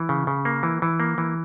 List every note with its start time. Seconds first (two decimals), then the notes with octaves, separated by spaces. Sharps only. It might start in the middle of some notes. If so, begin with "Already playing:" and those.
Already playing: E3
0.09 C#3
0.27 C#3
0.45 A#3
0.63 E3
0.82 E3
1.00 A#3
1.18 E3